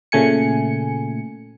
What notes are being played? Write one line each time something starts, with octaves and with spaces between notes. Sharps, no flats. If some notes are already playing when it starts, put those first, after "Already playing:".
A#2 C#3 A3 G#5 C#7